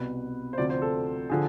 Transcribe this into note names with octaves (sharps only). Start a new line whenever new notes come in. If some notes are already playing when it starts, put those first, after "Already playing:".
Already playing: C2 B2 B4
C5
D2 C3 F3 D5
C5
A4
D3 F3 G#4